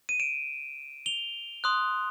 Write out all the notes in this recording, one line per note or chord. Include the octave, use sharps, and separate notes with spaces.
D#7
D7 E7
F7 G7
C6 D#6 F#6